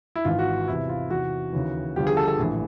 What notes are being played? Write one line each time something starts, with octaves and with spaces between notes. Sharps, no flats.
E4
G#1 G#2 E3 F4
F#4
E2 C3 E3 E4
F4
E2 C3 E3 F#4
D#2 C#3 E3
G1 G2 D3 F3 G4
G#4
A4
A4
A#1 A2 E3